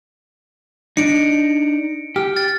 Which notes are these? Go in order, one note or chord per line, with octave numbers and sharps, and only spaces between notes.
D4 D#4 C#7 D7
G4 F6
F6 A6